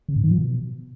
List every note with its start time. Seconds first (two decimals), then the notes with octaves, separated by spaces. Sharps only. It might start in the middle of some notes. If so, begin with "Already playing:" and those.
0.09 C#3
0.16 G#2
0.24 D#3
0.31 F3
0.39 B2